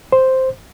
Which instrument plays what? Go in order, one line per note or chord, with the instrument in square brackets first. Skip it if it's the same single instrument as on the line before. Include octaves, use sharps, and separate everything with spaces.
[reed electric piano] C5